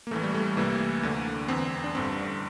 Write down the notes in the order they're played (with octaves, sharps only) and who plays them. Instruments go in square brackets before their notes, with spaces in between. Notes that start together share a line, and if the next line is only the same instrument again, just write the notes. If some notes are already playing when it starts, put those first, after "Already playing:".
[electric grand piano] A#3
A1 A2 E3 A3
G3
A3
C2 C3 E3 A#3
D2 D3
E2 E3 C4
D4
A1 G2 D3 C4